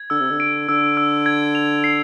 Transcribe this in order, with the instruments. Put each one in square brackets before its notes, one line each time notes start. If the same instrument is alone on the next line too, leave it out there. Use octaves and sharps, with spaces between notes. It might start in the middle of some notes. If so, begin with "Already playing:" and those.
Already playing: [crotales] G#6
[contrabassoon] D3 [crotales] E6
[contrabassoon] C3
D3
[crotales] D7
[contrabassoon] D3 [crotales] E6
[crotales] E6
G#6
F7
C7